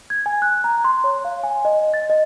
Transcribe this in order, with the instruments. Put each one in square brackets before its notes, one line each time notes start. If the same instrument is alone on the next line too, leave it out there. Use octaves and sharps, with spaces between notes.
[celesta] G#6
G#5
F#6
A#5
C6
C#5
F5
G#5
D#5
A6
D#5